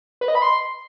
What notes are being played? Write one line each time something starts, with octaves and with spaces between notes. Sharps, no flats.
B4
D#5
B5
C6